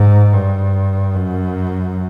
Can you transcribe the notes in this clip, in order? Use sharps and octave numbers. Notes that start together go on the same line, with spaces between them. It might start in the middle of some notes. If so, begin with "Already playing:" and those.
Already playing: G#2
G2
F#2